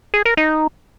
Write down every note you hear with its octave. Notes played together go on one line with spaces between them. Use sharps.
G#4
A#4
D#4